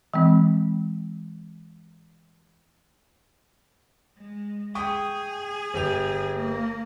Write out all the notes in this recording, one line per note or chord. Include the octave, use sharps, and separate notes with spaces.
E3 G#3 C4
G#3
G#4 G5 C#6 D#6
G1 G4 F7
A#3